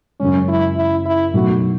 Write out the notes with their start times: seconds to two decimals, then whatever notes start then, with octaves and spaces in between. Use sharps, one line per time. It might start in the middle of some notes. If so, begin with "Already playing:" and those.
0.20 F#2 C#3 G#3 C#4
0.48 E4
0.77 E4
1.06 E4
1.34 B2 F#3 A3 D#4 F#4